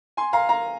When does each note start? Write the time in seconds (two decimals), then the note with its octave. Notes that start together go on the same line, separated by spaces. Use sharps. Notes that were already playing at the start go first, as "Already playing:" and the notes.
0.17 G#5 C6
0.33 F5 A#5
0.49 F5 A#5